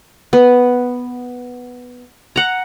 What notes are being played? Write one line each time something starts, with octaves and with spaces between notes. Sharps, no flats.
B3
F#5 A#5